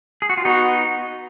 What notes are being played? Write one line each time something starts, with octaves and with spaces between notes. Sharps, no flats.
G#4
F#4
F4
B3 D#4 F#4